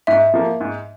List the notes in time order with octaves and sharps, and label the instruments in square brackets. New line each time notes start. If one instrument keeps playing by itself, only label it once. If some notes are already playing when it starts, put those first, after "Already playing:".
[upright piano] G#2 [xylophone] E5
[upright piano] F3 A#3
G#2